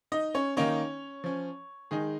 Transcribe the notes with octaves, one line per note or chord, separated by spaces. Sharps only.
D#4 D#5
C#4 C#5
D#3 A#3 C#4 D#4 C#5
F3 C#4
D#3 G#3 D#4 G#4